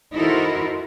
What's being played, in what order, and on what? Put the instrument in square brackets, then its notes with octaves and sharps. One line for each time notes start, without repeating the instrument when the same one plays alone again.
[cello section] D#4 E4 F#4 A4 A#4 C5